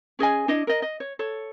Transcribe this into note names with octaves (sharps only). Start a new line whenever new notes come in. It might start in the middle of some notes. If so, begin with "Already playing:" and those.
C#4 G#4 D#5 G#5
D4 E4 D#5
A#4 D#5
D#5
C#5
A4 C#5